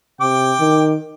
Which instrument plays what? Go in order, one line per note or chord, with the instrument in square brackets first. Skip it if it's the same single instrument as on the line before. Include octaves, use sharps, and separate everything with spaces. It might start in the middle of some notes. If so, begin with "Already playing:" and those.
[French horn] C3 [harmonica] G5 D6
[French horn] D#3